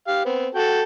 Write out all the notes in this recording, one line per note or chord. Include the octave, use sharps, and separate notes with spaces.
G4 F5
B3 C4
F#4 A4 G5